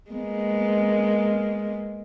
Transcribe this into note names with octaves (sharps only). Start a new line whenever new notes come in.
G#3 A#3 B3